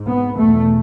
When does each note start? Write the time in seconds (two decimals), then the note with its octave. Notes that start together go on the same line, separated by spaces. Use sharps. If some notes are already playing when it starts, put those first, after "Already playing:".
Already playing: G#2
0.08 B3
0.38 E2 B2 A3